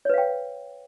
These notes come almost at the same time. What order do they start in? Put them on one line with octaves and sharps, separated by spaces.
C#5 B4 F5 G5